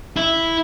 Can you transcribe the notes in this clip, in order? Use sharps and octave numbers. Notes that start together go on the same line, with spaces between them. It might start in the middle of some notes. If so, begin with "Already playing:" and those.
E4